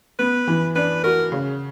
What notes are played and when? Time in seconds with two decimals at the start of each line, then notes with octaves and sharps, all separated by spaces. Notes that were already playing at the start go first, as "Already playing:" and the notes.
0.19 B3 B4
0.47 E3
0.75 D4 B4
1.04 F#4 A#4
1.32 C#3